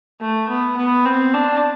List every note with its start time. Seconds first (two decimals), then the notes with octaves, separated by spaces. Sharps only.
0.21 A3
0.49 B3
0.77 B3
1.05 C4
1.34 D4